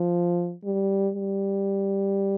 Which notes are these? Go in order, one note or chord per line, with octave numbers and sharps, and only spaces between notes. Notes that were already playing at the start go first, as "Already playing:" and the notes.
Already playing: F3
G3
G3